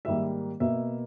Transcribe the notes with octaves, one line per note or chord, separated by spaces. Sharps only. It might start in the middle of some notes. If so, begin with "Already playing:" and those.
G#2 D#3 G3 A#3 E5
B2 A#3 E5